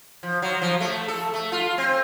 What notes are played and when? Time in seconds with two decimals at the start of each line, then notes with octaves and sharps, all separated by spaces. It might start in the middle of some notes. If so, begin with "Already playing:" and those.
0.23 F3
0.42 F#3
0.62 F3
0.80 A3
1.08 A4
1.34 A3
1.52 F4
1.78 C4